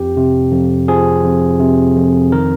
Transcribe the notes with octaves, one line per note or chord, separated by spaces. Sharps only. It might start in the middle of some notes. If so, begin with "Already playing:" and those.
Already playing: F2 F3 G4
C3
F2
F3 G#4
F2
C3
F2
D#3 A#4